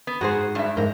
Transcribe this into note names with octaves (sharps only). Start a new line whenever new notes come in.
B3
G#2 F#4 G#4 C5
G2 E5
G#2 A#4